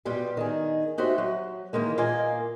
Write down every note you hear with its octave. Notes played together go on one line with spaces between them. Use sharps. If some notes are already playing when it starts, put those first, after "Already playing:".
B2 G3 F4 G4
D#3 D#4 G#4
D#4 F#4 G4 C5 E5
F#3
D#3 E3 G#3 A#3
A#2 A#3 F4 A#4 D#5 G#5